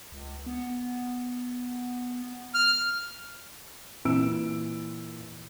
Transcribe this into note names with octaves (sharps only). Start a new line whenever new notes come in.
C#2
B3
F6
A#2 E3 E6 D7